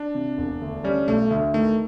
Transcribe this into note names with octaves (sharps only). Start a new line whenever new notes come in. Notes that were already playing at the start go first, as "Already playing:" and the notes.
Already playing: D4
C3
E1
D2
G3 C#4
B1 A3
D2
D#3 A3